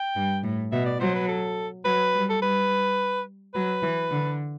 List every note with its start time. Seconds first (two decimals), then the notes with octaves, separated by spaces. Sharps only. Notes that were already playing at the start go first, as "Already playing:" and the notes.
Already playing: G5
0.15 G2
0.43 A2
0.72 B2 E5
0.86 D5
1.00 F#3 C5
1.14 B4
1.28 A4
1.85 F#3 B4
2.13 G3
2.30 A4
2.41 G3 B4
3.54 F#3 B4
3.83 E3
4.11 D3